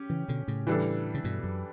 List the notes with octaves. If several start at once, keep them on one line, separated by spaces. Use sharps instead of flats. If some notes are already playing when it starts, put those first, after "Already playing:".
Already playing: C#4 G4
C#3 E3
B2 D3
A2 C#3
E3 G3 D4 A4
C#3
G2 B2
F#2